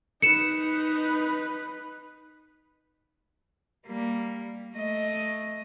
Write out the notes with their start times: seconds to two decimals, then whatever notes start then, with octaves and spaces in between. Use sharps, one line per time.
0.22 D#4 B4 C#7 E7
3.86 G3 A#3
4.74 A3 D#5